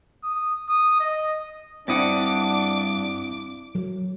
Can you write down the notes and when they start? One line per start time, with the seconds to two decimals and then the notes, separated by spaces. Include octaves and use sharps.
0.23 D#6
0.69 D#6
1.00 D#5
1.88 G2 C4 D4 E4 F#5 D6 D#6
3.75 F#3